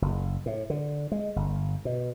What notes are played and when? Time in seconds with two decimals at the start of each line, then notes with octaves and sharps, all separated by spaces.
0.02 F#1
0.46 A2
0.70 D3
1.12 G#3
1.36 G1
1.85 B2